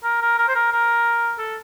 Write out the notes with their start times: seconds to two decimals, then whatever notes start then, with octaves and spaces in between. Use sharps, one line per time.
0.03 A#4
0.21 A#4
0.38 A#4
0.48 C5
0.55 A#4
0.72 A#4
1.39 A4